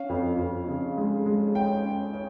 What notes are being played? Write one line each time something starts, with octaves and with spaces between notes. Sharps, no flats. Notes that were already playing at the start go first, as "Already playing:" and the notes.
Already playing: C#4 F5
F2
F2
C#3
G#3
G#3
C#4 G5
C#4
C#4